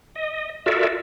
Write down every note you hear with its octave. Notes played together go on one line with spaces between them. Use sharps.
D#5
F4 F#4 A4 A#4 D5 E5